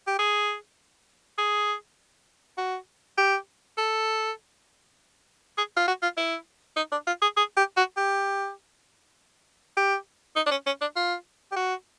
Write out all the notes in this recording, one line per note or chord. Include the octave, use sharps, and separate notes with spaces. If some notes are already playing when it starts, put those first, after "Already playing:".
G4
G#4
G#4
F#4
G4
A4
G#4
F4
F#4
F4
E4
D#4
D4
F4
G#4
G#4
G4
F#4
G4
G4
D#4
D4
C#4
C#4
D4
F4
G4
F#4